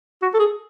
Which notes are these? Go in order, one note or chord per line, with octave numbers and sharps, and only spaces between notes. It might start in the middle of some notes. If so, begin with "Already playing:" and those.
F#4
A4
G#4